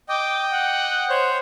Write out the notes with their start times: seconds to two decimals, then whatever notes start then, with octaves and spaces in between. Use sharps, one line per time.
0.09 D#5 G5 D6
0.51 F#5
1.09 C5 C#5